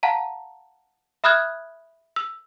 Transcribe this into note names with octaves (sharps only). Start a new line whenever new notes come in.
F5 F#5 A5 A#5
E5 B5 D#6 F6 F#6 G#6
E6